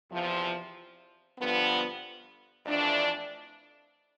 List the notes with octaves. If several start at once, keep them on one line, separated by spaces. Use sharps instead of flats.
E2 C3 F3
G2 D3 F3 B3
F2 E3 A3 D4